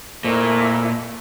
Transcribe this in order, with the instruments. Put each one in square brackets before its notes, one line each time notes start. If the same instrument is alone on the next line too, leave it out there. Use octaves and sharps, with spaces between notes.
[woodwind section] F2 A3 [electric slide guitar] A#2 [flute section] E4 A#4